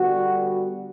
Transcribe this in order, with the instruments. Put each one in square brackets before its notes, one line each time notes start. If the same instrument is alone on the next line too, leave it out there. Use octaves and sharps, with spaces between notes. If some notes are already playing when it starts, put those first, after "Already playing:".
Already playing: [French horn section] D3 G3 B3 F#4